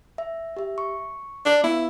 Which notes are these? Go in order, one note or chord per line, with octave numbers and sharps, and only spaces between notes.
E5
G4 E5
C#6
D4
B3 E4